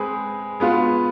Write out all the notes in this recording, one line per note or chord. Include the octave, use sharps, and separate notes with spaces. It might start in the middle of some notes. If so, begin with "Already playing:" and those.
Already playing: G#3 C4 G#4 B4
G#3 B3 F4